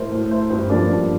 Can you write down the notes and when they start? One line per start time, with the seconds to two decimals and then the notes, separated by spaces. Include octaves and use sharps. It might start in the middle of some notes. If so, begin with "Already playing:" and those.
Already playing: A2 A3 A#4 C5
0.11 A2
0.31 A3 C5
0.50 G2 C5
0.70 F3 A#3 D4 D5
0.90 G2